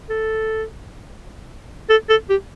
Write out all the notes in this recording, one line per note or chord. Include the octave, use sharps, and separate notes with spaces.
A4
A4
A4
G4